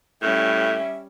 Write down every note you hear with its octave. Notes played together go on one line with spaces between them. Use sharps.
A2 G3 C#4 E5